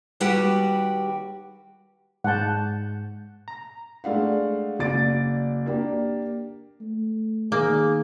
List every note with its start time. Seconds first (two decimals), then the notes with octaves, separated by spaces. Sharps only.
0.20 D#2 G3 F#4 G4 B4 F#5
2.24 G#2 F#5 A5 G6
3.48 A#5
4.04 G#3 A3 D4 F5 F#5
4.79 F#1 D5 A6 D7
5.66 A#3 D4 G4
6.81 A3
7.52 D#3 A#3 G#4